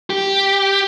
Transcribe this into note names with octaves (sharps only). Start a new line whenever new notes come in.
G4